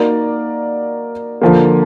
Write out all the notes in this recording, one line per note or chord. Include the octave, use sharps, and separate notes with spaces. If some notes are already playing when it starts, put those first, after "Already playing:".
Already playing: A#3 D#4 F#4 A#4 D5
D3 F3 A#3